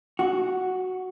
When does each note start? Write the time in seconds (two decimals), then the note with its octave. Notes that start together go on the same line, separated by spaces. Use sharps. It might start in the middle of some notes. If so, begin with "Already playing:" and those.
0.19 F#4